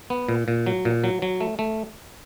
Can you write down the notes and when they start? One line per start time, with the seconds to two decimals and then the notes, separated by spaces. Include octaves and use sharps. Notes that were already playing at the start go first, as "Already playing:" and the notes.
0.10 B3
0.29 A#2
0.48 A#2
0.66 F#3
0.85 A#2
1.04 F#3
1.22 F#3
1.41 A3
1.59 A3